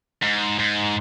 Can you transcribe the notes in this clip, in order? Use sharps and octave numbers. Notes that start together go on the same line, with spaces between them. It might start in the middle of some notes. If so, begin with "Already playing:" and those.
G#2
G#2